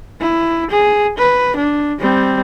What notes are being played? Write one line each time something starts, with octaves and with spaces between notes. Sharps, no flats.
E4
G#4
B4
D4
G3 C4